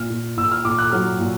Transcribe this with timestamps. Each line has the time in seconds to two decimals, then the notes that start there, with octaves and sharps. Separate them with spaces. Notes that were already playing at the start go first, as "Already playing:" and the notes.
Already playing: A#2 F6
0.10 A#2
0.37 A#2 E6
0.52 F6
0.65 A#2 D6
0.78 F#6
0.92 F#3 F6
1.19 A#2